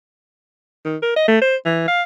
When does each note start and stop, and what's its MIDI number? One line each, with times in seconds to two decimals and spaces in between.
0.85 0.97 51
1.02 1.12 70
1.16 1.27 75
1.28 1.38 57
1.42 1.56 72
1.65 1.86 52
1.88 2.02 77